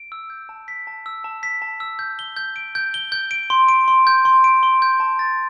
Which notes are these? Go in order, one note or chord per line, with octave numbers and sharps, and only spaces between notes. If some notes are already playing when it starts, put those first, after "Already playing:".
Already playing: D7
E6
G6
A5
B6
A5
E6
A5
B6
A5
E6
G6
G7
G6
D7
G6
G7
G6
D7
C6
D7
C6
G6
C6
D7
C6
G6
A5
A6